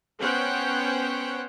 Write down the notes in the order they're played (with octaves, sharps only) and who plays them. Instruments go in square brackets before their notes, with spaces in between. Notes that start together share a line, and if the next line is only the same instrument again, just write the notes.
[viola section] B3 C#4 C5 C#5 F#5 G5